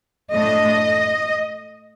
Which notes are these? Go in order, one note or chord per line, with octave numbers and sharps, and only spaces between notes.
A2 A3 D4 D#5